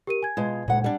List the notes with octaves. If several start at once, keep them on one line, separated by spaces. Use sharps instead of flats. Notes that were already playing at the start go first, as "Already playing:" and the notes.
G4 A#4 D#7
G#5 G#6
B2 G#3 F4
D2 A#2 G#3 F#5
G3 D4